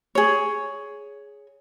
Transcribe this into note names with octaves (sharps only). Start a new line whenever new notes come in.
G#4 C#5